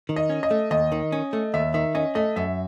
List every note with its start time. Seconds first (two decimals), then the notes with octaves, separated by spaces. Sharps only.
0.09 D#3
0.16 D#5
0.30 C#4
0.43 D#5
0.51 A3
0.71 D#2 D#5
0.92 D#3
1.12 C#4
1.33 A3
1.54 D#2 E5
1.74 D#3 E5
1.95 C#4 D#5
2.15 A3 D#5
2.36 F#2 E5